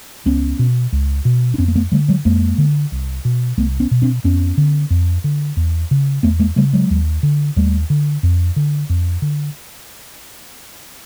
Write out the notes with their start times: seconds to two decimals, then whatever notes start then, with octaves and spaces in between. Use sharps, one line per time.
0.26 C#2 B3 C#4
0.59 B2
0.92 C#2
1.25 B2
1.54 D4
1.58 F2 B3 C#4
1.68 A#3
1.76 A3 B3
1.92 D3 G3 A3
2.08 F#3 G#3
2.25 F2 G#3 A#3
2.58 D3
2.92 C2
3.25 B2
3.57 C2 A3 B3
3.80 B3 C#4
3.91 B2
4.02 C4 D4
4.24 F2 B3 C#4
4.58 D3
4.90 F2
5.24 D3
5.57 E2
5.91 C#3
6.23 E2 A3 B3
6.40 G#3 A#3
6.56 C#3 G3 A3
6.73 F#3 G#3
6.90 D#2
7.23 D3
7.56 D#2 G3 A3
7.90 D3
8.23 F2
8.56 D3
8.89 F2
9.22 D3